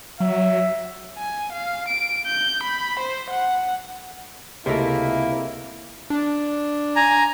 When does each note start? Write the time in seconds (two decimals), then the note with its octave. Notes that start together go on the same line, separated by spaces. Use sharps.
0.20 F#3 E5
1.18 G#5
1.53 F5
1.88 D7
2.26 G6
2.63 B5
2.99 C5
3.30 F#5
4.66 C#2 C3 A3 A#3 E4 A#4
6.10 D4
6.96 G#5 A#5